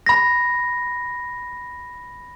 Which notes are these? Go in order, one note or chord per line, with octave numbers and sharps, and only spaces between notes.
B5 A#6